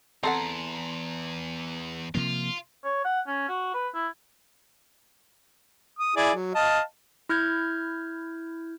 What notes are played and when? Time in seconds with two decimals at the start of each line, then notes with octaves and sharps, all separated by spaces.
0.23 E2 C4 A4 F#5 A5 A#5 C6
2.15 C3 F3 A#3 F4
2.84 C#5
3.05 F#5
3.27 C#4
3.48 F#4
3.74 B4
3.94 E4
5.99 D#6
6.16 E4 G#4 D5
6.34 F#3
6.55 D#5 F5 A5
7.29 E4 F6 G6 G#6